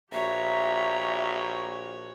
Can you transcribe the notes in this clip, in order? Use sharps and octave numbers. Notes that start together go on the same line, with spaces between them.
A#1 F#4 G4 C#5 E5 A#5